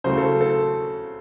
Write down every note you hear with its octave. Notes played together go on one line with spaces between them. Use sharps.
C#3 F#3 A3 C5
A4
A4